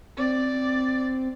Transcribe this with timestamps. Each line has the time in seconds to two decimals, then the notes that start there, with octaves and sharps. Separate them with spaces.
0.17 C4 D5